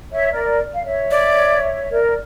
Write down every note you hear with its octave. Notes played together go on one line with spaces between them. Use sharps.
C#5 E5
A#4 D5
F5
C#5 E5
D5
A#4 D5